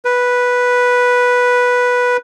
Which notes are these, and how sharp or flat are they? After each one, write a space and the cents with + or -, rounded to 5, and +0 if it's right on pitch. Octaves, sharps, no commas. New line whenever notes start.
B4 -5